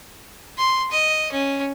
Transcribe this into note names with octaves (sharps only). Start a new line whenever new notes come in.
C6
D#5
C#4